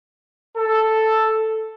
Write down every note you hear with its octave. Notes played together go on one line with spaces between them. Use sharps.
A4